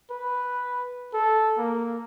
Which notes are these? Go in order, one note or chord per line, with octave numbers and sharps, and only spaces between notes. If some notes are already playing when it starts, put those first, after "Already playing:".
B4
A4
A#3